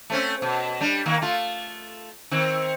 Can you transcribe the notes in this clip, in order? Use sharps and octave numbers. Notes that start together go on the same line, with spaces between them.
A3 C4 C#4
B2
G3 D4
D#3 A#3
A3 F4
D#3 C4